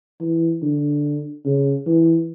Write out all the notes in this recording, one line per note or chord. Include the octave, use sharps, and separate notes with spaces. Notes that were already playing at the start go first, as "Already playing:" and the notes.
E3
D3
C#3
E3